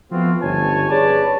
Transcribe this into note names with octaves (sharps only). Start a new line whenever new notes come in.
F3 A3 B3 C4 F4 F#4
G1 C#2 C#4 C#5 G#5 A5
G#4 B4 C#5 D5 A5